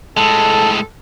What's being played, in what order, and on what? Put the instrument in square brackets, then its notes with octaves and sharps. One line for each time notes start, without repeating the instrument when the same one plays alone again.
[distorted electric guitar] A2 G#3 [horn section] A4 [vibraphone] A5